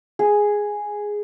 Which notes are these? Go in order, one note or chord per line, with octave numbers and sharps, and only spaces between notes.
G#4